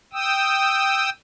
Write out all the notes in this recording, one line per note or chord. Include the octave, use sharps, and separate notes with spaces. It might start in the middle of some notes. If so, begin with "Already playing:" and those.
G5 D#6 E6